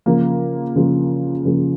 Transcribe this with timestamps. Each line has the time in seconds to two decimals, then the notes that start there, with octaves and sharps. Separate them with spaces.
0.06 C#3 F3 A#3
0.76 C#3 F3 A#3
1.45 C#3 F3 A#3